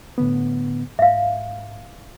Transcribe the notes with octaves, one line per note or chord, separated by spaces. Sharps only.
A2 D3 B3
G#2 E5 F5